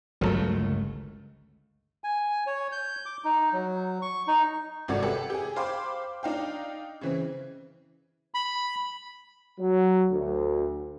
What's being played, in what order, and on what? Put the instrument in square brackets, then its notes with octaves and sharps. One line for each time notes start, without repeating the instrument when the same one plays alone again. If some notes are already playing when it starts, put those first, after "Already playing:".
[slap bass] G1 C#2 A3 [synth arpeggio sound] F#3 A4 A#4
[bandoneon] G#5
C#5
G6
D6
D#4
F#3
C#6
D#4
[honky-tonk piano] G#1 C3 F#4 A4 D5 G#6
G4 A4 B4 E5 F#5 G5
G4 G#4
C5 F5 G5 B5 C6 D6
D4 D#4 F5 G5
C#3 E3 C4
[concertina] B5
[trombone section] F#3
D2